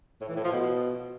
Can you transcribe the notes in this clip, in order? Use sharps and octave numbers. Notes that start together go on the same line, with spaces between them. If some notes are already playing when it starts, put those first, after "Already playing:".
A2
E3
A2
F3
B2